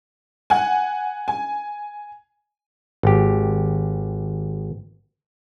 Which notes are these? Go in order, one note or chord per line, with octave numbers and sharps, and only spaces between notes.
F#5 G#5
G#5
G#1 G4